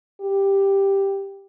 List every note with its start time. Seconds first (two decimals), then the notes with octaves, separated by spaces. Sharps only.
0.21 G4